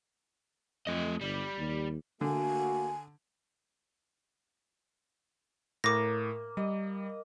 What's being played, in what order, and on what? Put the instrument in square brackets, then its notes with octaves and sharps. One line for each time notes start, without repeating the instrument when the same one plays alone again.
[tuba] F2 [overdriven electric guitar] A3 D#5
[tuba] G1 [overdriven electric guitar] G3
[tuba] D#2
[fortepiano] D3 [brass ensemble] A3 A#3 F#4 [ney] G#5
[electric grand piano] A2 [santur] A#3 [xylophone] D6 A#6
[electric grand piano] G3 [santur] D#5